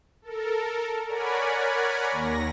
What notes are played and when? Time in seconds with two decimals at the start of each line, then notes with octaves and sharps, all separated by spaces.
0.22 A4 A#4
1.07 A#4 C#5 D5 F#5 G#5 B5
2.11 D#2 A#6